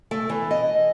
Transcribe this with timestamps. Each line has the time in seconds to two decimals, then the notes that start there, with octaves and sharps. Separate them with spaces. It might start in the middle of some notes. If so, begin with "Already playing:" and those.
0.11 A3
0.29 E3
0.51 D#5